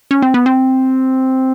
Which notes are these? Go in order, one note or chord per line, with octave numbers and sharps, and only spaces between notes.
C#4
C4
B3
C4